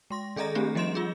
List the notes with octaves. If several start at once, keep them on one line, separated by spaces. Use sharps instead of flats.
G#3 C6 A#6
D#3 G#4 A4 D#5 A#5 A#6
A3 C4 D4 G4 G#4
F3 G3 D#5 C6 E7
F4 G#4